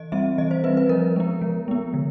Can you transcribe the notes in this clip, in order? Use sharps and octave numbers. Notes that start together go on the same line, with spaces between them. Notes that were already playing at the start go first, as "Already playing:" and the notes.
Already playing: E3 D#5
G3 C4 E5
E3 D#5
C5
G3 C4 B4
B4
F3 A#4
G#3 B3
F3
G#3 B3
D3